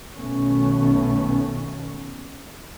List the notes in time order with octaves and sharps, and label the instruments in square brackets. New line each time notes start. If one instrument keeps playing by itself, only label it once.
[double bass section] B1 B2 D#3 A3 B3 C#4